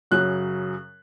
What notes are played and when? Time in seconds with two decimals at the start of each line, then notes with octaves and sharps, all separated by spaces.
0.11 F#2 C#3 F#3 F#6